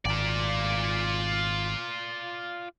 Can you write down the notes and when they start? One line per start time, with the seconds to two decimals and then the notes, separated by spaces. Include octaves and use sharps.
0.05 G#1 F4 D5